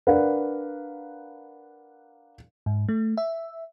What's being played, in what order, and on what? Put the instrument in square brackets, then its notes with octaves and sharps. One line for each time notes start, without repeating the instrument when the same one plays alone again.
[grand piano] D4 A#4 B4 F5 F#5
[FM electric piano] G#2
A3
E5